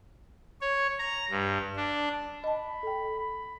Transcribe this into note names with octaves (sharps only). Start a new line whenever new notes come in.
C#5
A#5
G2
D4
D#5 A5 B5
A4 G5
B5